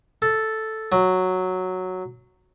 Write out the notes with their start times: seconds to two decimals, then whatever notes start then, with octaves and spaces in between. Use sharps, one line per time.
0.22 A4
0.92 F#3